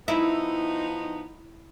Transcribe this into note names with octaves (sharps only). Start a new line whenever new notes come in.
F3 B3 D#4 E4